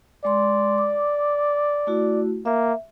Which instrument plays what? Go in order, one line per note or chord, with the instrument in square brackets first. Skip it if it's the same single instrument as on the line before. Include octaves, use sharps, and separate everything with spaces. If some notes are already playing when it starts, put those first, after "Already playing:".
[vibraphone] G#3 C6 [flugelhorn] D5
[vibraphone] D6
A3 E4 F#4
[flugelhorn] A#3 [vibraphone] E5